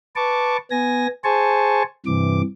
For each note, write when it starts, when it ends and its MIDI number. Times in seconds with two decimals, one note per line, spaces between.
0.16 0.57 71
0.16 0.57 81
0.16 0.57 85
0.16 0.57 86
0.71 1.07 59
0.71 1.07 80
0.71 1.07 94
1.24 1.83 68
1.24 1.83 72
1.24 1.83 80
1.24 1.83 81
1.24 1.83 85
2.06 2.42 43
2.06 2.42 48
2.06 2.42 52
2.06 2.42 86